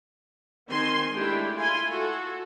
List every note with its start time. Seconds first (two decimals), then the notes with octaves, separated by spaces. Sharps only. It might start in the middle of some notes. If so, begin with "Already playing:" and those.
0.69 D#3 C4 G#5 C6
1.12 G#3 A3 D4 E4 G4 G5
1.55 E4 F4 G#5 C6
1.89 F#4 A4